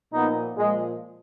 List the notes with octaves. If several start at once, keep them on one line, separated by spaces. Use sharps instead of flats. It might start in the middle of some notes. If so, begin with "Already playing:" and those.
A#2 F3 B3 D#4
A#2 F3 G#3